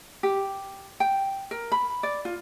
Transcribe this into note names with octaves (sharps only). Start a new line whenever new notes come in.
G4
G5
A#4
B5
D5
F4